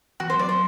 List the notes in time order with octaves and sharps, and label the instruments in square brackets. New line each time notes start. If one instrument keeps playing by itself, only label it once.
[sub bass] E3 [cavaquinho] F#4
[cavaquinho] C5
[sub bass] F#3 [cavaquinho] D5
[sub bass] F#3 [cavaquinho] C5